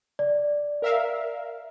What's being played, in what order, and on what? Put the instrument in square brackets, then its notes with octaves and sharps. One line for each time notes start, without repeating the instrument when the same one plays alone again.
[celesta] D5
[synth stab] A#4 E5 F5